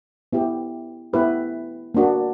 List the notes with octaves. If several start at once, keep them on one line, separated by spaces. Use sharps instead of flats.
B3 E4 G4
B3 E4 G4 B4
A#3 D4 F#4